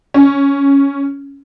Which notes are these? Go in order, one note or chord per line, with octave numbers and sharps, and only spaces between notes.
C#4